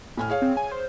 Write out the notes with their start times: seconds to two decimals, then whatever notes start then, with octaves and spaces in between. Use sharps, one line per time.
0.17 A2 G#5 F6
0.29 G#4 C#5 F5
0.42 C4
0.57 G#5
0.72 C5